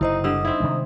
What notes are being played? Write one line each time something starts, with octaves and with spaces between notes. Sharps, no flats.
F#1 C3 D#4 E4 C5 D#5
D3 G3 D#5 E6
C4 D#4 E4
C3 D#3 G#3